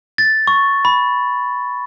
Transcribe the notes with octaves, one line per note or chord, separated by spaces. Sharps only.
A6
C#6
B5